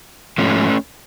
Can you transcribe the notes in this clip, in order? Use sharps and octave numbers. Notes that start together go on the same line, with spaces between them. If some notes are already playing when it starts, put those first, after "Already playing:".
G#2 F3 A3 C#4